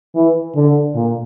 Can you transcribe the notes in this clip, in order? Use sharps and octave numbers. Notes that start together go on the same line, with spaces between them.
E3
D3
A#2